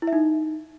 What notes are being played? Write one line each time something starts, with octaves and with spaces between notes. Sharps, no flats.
E4
E5
D#4